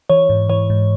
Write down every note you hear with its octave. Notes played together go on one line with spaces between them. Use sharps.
E3 C#5
G#2
E3 C#5
G#2